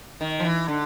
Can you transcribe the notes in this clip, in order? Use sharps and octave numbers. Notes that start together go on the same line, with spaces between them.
D#3
F3
E3
D3